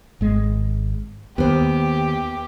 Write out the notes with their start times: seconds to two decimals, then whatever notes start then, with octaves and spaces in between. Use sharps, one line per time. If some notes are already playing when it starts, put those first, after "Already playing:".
0.21 G#1 G#3
1.38 D#2 B3 G4 C5